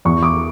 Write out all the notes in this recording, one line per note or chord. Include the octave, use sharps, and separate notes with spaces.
E2 C#6
D6